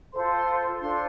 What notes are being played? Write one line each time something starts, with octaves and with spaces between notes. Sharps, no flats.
F4 A4 C5 C6
C6
D4 F4 A4 C5 C6